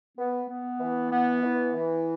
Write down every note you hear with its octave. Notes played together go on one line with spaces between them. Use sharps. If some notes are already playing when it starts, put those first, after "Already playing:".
B3
B3
E3
B3
E3
E3